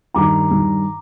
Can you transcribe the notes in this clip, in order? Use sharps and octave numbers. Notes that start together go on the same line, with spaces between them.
G2 D#3 G3 A#5 D6
G2 D#3 G3